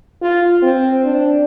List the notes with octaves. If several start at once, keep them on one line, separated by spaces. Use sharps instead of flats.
F4
C4
D4